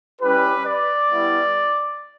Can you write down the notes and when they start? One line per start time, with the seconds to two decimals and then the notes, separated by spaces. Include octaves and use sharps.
0.20 G3 C#4 E4 G4 B4
0.64 D5
1.09 G3 B3 E4